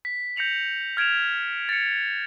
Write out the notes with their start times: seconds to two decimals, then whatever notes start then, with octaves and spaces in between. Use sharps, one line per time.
0.05 B6
0.36 G6 A#6 C#7 F7 F#7
0.97 F6 G#6 D7 E7 F7
1.69 A6 C#7